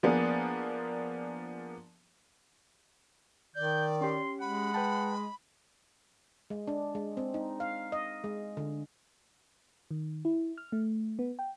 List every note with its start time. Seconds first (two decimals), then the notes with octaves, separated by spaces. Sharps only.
0.03 F3 A#3 B3 D4 G#4
3.56 D#3 D5 G6
4.01 C#4 G4 C6
4.41 G#3 F#5 B5
4.74 B4 G5 A5
6.50 G#3
6.68 D4
6.95 G#3
7.17 C4
7.34 D#4
7.60 F5
7.92 D#5
8.24 G#3
8.57 D3
9.91 D#3
10.25 E4
10.58 F6
10.72 A3
11.19 B3
11.39 G5